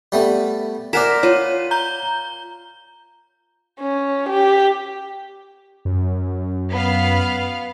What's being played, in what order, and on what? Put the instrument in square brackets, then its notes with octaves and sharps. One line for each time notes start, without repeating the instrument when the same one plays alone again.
[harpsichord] G3 A3 B3
[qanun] A#4 C5 [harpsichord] D5 F#5 G#5 [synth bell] B6 E7
[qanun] F4 [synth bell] C#5 D#7
[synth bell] A#5 G6 G7
[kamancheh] C#4
G4
[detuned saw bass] F#2
[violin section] B3 F5